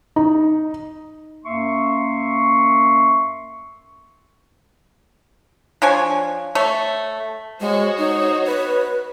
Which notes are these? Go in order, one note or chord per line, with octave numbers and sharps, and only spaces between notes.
D#4
F#2 A#3 E5 C6 C#6
F3 D4 C#5 G#5
A3 C#5
G#3 F#4 C5 C#5
D#4
B4